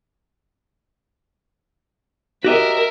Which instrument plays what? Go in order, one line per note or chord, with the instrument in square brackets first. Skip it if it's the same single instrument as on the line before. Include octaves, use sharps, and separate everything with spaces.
[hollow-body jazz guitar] F#4 G4 D#5 [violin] A#4 E5